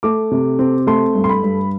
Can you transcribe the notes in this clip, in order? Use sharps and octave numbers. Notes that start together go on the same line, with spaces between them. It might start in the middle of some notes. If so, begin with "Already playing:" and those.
A3 D6
C3
C4
A3 C6
G2
C6
B5
G2